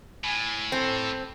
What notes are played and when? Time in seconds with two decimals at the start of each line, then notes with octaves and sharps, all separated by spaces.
0.24 A2 G#5
0.72 A3 C4 A4